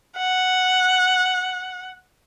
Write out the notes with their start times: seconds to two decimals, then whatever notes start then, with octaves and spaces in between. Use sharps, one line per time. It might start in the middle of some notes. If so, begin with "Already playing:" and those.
0.17 F#5